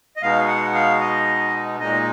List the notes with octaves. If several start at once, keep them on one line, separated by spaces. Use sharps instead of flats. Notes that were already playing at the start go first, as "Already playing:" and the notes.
D#5
B2 G#3 B3 D#4 F5
F#5
F5
D#5
A#2 G#3 D#4 D#5